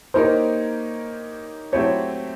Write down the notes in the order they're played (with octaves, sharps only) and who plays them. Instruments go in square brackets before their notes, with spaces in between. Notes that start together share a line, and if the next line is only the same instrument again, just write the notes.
[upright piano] A#3 D#4 G4 A#4 C#5 [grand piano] C5
[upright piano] F#3 A3 C4 E4 G4 [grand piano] C#5